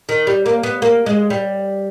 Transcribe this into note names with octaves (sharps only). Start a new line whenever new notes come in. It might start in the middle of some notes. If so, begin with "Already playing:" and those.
D#3
G3
A#3
B3
A#3
G#3
G3